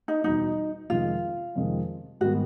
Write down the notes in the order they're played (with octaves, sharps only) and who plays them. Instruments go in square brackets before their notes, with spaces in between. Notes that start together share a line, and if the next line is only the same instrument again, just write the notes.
[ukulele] D#4
[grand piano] E2 B2 G3 [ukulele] D#4
[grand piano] F2 C3 D#3 G#3 [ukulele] F4
[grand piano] F2 C3 D#3 G#3
[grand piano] G#2 D#3 G3 B3 [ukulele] F#4